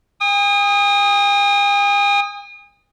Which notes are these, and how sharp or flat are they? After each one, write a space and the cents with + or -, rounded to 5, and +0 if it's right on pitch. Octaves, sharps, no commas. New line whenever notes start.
G#5 -45 D#6 +0